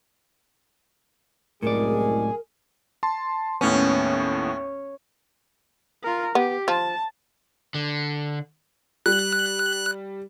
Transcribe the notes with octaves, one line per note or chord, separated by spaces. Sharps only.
C2 F#2 A2 G#3 G#4 A#4 D5
A5 C6
D#2 A2 B3 C#4
F4 A#4
B3 G4
F3 A5
D3
G3 F#6